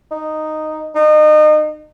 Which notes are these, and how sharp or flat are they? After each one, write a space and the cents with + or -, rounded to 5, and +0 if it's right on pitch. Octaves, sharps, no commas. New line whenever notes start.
D#4 -5
D#4 -30